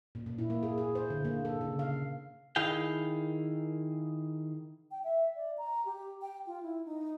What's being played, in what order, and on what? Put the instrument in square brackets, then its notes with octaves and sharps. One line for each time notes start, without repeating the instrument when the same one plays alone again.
[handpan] A#2
A#2
E4
A#3
G#4
G#4
C5
D3
A#3
A4
C#3
F5
[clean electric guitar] D#3 E4 G#4 F5 G5
[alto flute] G5
E5
D5
A#5
G4
G5
F4
E4
D#4